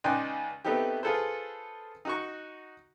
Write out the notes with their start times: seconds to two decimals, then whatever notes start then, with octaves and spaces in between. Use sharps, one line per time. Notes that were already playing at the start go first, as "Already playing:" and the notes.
0.04 C#2 D#4 D5 G5 C6 F#6
0.65 A3 B3 C4 D#4 G4
1.03 F4 G#4 A4 B4 C5
2.05 D#4 F#4 C#6